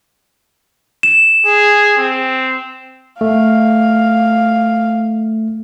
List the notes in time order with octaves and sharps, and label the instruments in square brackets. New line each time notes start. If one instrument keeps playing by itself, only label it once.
[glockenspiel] E7
[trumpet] G#4
C4
[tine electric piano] A3 [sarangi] F5